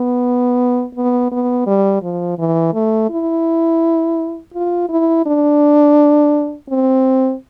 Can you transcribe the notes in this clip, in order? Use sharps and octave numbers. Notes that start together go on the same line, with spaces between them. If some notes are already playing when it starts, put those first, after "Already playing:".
Already playing: B3
B3
B3
G3
F3
E3
A3
E4
F4
E4
D4
C4